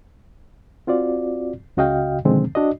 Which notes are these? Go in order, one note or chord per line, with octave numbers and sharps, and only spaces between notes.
C4 F4 F#4 D5
C#2 C#3 F#4 D#5 F5 G5
B2 D3 D#3 F3 G#3 C4
D4 F#4 D5 D#5